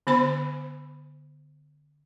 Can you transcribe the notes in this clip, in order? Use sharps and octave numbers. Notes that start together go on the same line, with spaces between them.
D3 B3 C5 B5